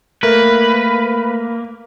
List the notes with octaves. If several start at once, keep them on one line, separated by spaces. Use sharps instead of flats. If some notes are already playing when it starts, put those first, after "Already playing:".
A3 A#3 A#4 B4